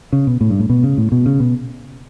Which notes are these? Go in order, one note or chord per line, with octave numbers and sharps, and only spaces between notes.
C#3
B2
A2
G2
A2
B2
C#3
A2
B2
C#3
B2